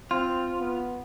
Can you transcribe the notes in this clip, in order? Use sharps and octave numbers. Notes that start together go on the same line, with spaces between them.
C4 F4
B3